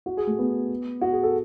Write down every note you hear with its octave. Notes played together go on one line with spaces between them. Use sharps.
F#4
G#4
A3
B3
F#4
G#4
A4